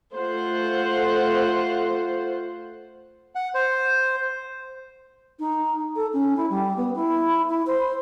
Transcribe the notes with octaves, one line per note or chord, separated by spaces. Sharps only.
A3 F4 C5 F#5
F#5
C5
D#4
A4
C#4
E4
G3
B3
E4
E4
C5